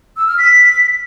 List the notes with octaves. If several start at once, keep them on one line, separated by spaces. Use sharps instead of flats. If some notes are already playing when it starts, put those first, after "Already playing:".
E6
F6
B6